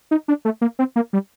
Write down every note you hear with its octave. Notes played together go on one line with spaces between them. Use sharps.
D#4
D4
A3
A#3
C4
A#3
G3